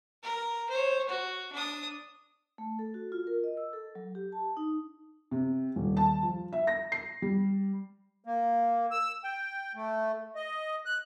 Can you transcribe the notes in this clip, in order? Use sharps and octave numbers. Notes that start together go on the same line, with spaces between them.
A#4
C5 C#5
F#4
D4 D#6
A3
A4
F#4
F4
A#4
D#5
E6
A4
F#3
G4
A5
D#4
C3
D#1
A5
F3
E5
A#6
C7
G3
A#3
E6
G5
A3
D#5
F#6